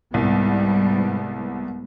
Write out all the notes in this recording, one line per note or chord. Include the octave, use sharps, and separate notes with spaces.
C2 G#2 G3 B3